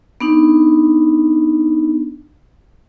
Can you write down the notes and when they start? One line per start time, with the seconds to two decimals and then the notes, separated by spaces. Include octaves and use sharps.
0.21 B3 D4 D#4